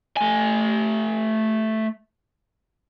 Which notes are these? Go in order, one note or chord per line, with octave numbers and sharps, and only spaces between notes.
A3 G#5